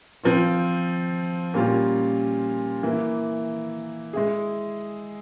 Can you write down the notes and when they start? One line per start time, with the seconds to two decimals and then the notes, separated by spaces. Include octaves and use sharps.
0.24 F3 C4 F4
1.54 A#2 G3 C#4 F4 A#4
2.83 E3 A#3 E4
4.13 G#3 E4 G#4